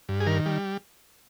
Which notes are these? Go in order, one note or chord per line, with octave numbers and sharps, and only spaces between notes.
G2
G#4
D#3 A#4
G3